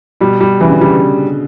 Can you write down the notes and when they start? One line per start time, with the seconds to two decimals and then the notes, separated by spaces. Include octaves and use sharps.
0.21 B2 G3
0.41 G3
0.60 C#3 E3
0.70 D3
0.81 C#3 G3